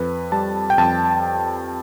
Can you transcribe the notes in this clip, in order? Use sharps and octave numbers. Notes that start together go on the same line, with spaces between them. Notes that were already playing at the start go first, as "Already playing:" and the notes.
Already playing: F2 B4
G3 A5
G5
F2 A5